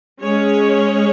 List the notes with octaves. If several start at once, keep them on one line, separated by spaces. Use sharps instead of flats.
G#3 C#4 G#4 C#5